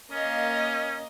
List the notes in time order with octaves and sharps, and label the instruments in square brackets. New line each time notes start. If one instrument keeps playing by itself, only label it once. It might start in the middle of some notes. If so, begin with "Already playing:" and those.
[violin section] A#3 D#5 F5 [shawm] C#4